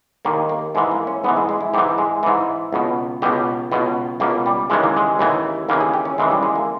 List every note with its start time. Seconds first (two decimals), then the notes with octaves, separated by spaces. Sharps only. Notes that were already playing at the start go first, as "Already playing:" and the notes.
0.25 D#2 D#3 A#3
0.49 A#3
0.75 G#2 E3 G#3
0.91 A#3
1.07 C#4
1.24 G#2 E3 B3
1.36 G#3
1.49 G#3
1.61 E4
1.74 G#2 E3 G4
1.98 G#3
2.23 G#2 E3
2.73 C#2 B2
3.22 C#2 B2 G4
3.72 C#2 B2
4.20 C#2 B2 A#3
4.46 G3
4.70 D#2 C#3 E3 G#3
4.83 A#3
4.97 G#3
5.19 D#2 C#3 E3
5.69 D#2 C#3 E3 A#3
5.81 G#4
5.94 G4
6.05 C#4
6.18 D#2 C#3 E3 G#3
6.31 G3
6.43 G#3
6.56 A#3